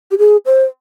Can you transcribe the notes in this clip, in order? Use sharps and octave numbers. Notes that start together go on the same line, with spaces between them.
G4
G#4
C5